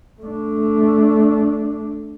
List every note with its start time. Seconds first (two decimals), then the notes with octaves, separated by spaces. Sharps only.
0.21 A3 D4